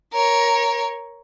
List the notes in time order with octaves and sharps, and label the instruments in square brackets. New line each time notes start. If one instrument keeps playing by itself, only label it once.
[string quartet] A#4 C#5